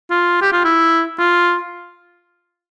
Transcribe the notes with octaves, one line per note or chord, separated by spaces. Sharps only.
F4
G4
F4
E4
F4